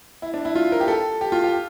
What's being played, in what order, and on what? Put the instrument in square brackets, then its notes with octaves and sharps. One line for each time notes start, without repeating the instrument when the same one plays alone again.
[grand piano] E4
D4
E4
F4
A#4
G4
A4
G4
F4
G4